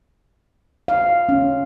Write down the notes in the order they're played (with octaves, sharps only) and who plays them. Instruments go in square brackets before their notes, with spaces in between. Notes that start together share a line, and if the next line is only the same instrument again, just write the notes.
[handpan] F5
C#4